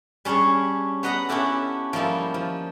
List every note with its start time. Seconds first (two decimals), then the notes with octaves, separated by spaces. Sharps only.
0.25 G3 C#4 D4 G#4 C#5
1.03 B3 B4 D#5 F#5 A#5
1.29 C#4 D4 E4 G4 A4
1.93 F3 G3 A#3 D#4 E4
2.34 F3